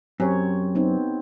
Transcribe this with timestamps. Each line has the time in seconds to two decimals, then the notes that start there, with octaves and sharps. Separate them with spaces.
0.20 F#2 C4 G4 C#5
0.75 B3 C4 D#4